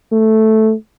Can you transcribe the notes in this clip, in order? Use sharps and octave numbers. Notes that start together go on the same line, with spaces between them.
A3